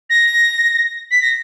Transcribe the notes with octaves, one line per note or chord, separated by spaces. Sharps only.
A#6
B6
A#6